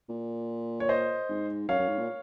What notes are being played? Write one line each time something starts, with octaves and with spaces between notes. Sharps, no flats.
A#2
C#5
C5 D#5
G#2
F#2 C#5 F5
F#2
G#2
A#2